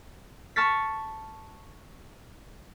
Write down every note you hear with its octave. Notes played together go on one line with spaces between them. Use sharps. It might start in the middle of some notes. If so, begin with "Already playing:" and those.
A5 C#6 F6 A6 B6